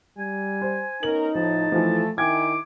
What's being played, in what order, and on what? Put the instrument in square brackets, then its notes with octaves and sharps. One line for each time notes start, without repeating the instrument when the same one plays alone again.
[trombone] G3 [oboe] G#5
[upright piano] C5
[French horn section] B3 C#4 A#4 [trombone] D#4 [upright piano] F#7
[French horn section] A2 [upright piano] F3 [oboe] A5
[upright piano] E3 F3 [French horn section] A3
[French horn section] D#3 E4 [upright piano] G5 G#5 G#6 [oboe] D6